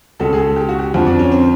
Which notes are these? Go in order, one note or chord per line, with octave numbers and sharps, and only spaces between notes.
C#2 B2 A4
G#4
A4
G4
F#4
G4
F2 D3 F3 F#4
D4
C#4
C4